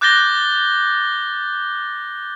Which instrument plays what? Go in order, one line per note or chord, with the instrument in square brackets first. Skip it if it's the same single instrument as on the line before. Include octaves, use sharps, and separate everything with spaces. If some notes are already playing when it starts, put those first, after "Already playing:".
[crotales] D6 F#6 G6 A6 A#6 G7